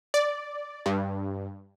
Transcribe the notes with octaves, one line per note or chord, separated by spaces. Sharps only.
D5
G2